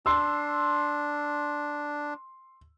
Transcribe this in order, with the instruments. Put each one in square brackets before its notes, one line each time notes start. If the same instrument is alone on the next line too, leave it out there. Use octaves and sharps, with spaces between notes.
[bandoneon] D4 [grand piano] C6 E6